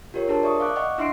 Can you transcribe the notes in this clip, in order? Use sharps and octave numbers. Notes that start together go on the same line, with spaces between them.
F4 G4 A#4 C#5
D4 G#4 A#4 C5 A5
D5 E5 C#6 D#6
F5 C#6 D6 F#6
D#5 F#5 C#6
D4 E4 E5 C6 C7 D7